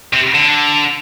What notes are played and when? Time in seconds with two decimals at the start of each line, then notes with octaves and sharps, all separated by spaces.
0.13 C3
0.35 D3